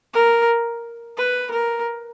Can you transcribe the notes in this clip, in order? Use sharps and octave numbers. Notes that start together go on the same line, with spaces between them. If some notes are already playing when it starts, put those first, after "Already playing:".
A#4
B4
A#4